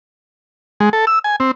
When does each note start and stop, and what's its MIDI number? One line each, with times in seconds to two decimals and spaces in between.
0.80 0.89 56
0.93 1.05 69
1.07 1.19 88
1.24 1.36 80
1.40 1.51 60